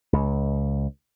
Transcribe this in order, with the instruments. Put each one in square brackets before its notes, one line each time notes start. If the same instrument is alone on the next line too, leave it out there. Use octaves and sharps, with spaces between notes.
[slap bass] C#2